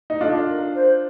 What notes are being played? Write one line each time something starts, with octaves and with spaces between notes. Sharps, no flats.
D#4
D4 F4 A4
A#4
C5